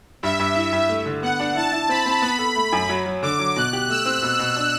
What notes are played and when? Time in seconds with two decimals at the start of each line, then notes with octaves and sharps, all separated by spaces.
0.23 G2 E5
0.40 G2
0.56 E4
0.72 G2
0.89 A3
1.06 D3
1.23 B3 F#5
1.40 D4
1.55 E4 A5
1.72 E4
1.89 C4 B5
2.06 C4
2.22 B3 B5
2.39 A4
2.56 A3
2.72 F#2
2.89 F#3
3.06 F#3
3.23 D3 D6
3.39 F#3
3.56 B2 F#6
3.73 G4
3.89 A3 E6
4.06 C4
4.22 B2
4.39 B2
4.56 D4